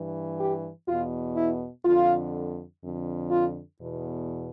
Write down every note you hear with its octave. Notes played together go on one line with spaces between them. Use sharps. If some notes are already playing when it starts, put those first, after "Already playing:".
Already playing: G2 E3
G4
E2 B2 F4
E4
F2 D3 F4
F2 D3
F4
E2 B2